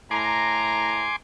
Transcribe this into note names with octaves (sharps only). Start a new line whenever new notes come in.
A2 G#5 A#5 C6 D6